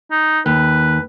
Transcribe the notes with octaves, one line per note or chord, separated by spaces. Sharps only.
D#4
D#2 B4